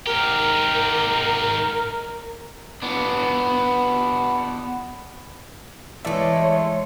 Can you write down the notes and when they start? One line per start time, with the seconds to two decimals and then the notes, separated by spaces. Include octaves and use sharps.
0.06 G#2 G4 A#4
2.82 B3 D4
6.05 E3 G#3 A3 A4 C#5 D5 E5